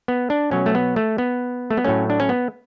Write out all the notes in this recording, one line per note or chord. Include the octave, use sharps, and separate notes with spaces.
B3
D4
B2 F#3 A3 C#4
A3
B3
A3
B3
A3
B3
A2 F#3 A3 C#4
D4
C#4
B3